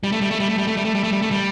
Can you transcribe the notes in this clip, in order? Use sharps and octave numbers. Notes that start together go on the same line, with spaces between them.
G3
A3
G3
A3
G3
A3
G3
A3
G3
A3
G3
A3
G3
A3
G3